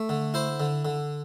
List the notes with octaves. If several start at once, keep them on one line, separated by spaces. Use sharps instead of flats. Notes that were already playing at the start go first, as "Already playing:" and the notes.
Already playing: A3
D3
E4 C5
D3
D3